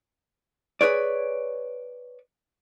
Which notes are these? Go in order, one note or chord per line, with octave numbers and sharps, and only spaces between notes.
G#4 B4 C#5 D5